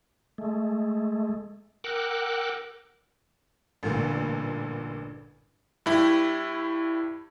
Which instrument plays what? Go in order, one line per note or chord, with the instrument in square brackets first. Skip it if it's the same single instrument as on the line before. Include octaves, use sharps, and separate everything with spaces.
[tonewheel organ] G#3 A3
A#4 F#5 G5 D6 E6 F#6
[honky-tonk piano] A1 G2 A#2 D3
[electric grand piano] G2 E4 G4